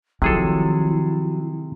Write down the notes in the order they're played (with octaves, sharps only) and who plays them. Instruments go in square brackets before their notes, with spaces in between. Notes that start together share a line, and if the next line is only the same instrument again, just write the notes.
[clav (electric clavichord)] C3 G#4 A4 [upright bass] D#3 [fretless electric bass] F3 F#3 [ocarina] E4